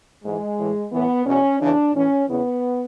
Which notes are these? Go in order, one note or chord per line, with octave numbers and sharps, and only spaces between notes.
G#2 E3 G#3
A2 E3
A2 E3 B3
E2 B2 C#4
E2 C#3 E3 D4
A2 E3 C#4
E2 C#3 E3 B3